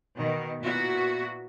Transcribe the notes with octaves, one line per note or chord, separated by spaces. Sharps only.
B2 D#3
A#2 B3 E4 F#4